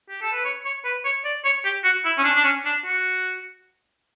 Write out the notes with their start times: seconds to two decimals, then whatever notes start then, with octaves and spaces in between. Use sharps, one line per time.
0.09 G4
0.22 A4
0.33 B4
0.45 C#5
0.65 C#5
0.85 B4
1.05 C#5
1.25 D5
1.45 C#5
1.65 G4
1.84 F#4
2.05 E4
2.18 C#4
2.24 D4
2.36 D4
2.44 C#4
2.65 D4
2.85 F#4